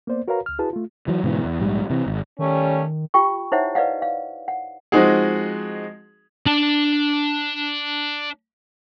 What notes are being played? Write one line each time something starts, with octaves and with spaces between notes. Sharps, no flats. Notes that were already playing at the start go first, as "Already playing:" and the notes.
A#3 B3 C5 D5
F#4 A#4 B4 C#5 F5 A#5
D2 F6
E4 F#4 G#4 B4 A5
A3 F4
E3 F#3
G#2 B2 D3 E3
E2
A#1 G#2 G3
C3 E3
G#1
D#3 G3 A3 C#4
F4 G4 G5 C#6
D#4 E4 C5 C#5 E5 F#5
B4 D5 D#5 F5 F#5
F5
F#5
F3 G#3 C4 D#4 F#4 G#4
D4 A5